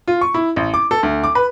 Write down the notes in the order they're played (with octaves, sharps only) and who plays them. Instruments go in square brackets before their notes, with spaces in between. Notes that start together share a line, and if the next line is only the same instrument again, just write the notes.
[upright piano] F4
C#6
E4
A1
D6
A4
D2
D6
B4